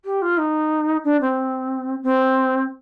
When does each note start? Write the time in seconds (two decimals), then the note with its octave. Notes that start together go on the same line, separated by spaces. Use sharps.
0.04 G4
0.22 F4
0.37 D#4
1.04 D4
1.21 C4
2.02 C4